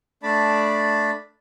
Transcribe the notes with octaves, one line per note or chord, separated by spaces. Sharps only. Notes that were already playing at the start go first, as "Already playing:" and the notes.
A3 D4 D5 A5 B5